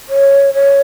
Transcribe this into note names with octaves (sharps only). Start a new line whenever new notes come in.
C#5
C#5